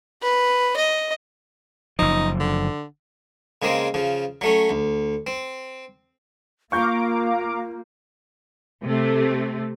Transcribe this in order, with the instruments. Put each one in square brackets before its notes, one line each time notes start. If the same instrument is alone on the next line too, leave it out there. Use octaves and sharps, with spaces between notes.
[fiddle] B4
D#5
[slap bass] F#1 F3 [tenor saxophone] D#4
[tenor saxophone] D3
[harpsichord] C#3 G#3 A#3 C4
C#3 F3
F#3 A3 C#4
D2
C4
[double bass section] A#3 [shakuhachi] F4 [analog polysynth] F5 A#5 D6 [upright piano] C#6 G6
[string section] C3 A3